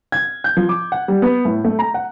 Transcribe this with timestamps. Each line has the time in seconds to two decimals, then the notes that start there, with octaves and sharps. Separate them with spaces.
0.12 G#6
0.44 G6
0.57 F3
0.69 D6
0.92 F#5
1.08 G3
1.22 B3
1.45 A2
1.65 A3
1.79 A#5
1.94 F#5